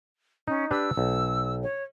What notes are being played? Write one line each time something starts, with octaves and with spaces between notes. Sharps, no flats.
C#4 D#4
D4 G4 B4 E6
B1
C#5